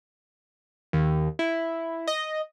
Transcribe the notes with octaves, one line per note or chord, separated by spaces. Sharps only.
D#2
E4
D#5